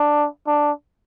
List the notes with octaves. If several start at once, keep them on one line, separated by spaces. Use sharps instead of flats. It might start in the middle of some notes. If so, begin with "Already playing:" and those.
Already playing: D4
D4